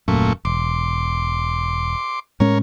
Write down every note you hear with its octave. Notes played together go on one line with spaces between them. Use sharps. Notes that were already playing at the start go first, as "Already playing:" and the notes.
D#1 F#2 A#2 A3 C#6
E1 C6 D6
A2 G#3 C#4 A#4 C#5